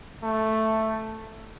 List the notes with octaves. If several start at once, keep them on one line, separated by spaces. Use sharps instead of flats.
A3